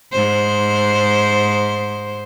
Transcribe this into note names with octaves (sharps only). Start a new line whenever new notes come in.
G#2 C5